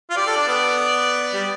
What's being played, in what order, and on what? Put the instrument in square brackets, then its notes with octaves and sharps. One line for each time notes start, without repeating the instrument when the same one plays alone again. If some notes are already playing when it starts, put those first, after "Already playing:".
[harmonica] F4
[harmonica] G4 [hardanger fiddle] D5
[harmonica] A4
D4
B3
G3